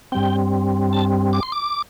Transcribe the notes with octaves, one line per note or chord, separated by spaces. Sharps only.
G2 G3 C4 G5
A5
D6
C6
D6